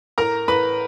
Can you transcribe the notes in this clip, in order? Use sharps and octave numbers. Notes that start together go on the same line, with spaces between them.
A2 A#4 A#5
A2 B4 B5